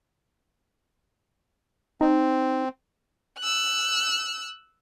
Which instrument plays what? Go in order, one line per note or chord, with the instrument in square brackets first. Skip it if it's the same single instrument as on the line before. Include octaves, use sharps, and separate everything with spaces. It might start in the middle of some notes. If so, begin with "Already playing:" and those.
[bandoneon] C4 [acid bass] D#4
[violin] E6 F#6